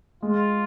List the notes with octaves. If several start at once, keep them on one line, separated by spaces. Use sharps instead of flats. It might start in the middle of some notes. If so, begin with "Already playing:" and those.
G#3 F4